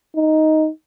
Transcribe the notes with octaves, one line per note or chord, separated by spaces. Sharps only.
D#4